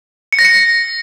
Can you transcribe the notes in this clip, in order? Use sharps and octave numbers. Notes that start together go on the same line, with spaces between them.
C#7
A#6
C#7